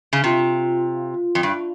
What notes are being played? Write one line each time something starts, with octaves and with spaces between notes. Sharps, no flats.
C#3
C3 F4
F2
G2